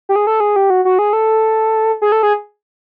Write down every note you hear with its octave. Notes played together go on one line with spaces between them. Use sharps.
G4
G#4
A4
G#4
G4
F#4
F#4
G#4
A4
G#4
A4
G#4